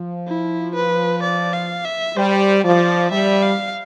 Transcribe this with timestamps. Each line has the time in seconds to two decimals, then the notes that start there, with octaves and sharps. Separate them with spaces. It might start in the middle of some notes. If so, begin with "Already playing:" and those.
Already playing: F3
0.27 E4
0.75 B4
1.22 D5
1.53 F5
1.85 E5
2.16 G3 C5
2.64 F3 D5
3.11 G3 E5
3.42 F5